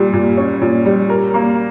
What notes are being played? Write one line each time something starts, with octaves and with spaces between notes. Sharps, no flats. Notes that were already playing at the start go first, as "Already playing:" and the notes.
Already playing: A#2 G3
A#2
C#4
A#2
G3
A#4
A#3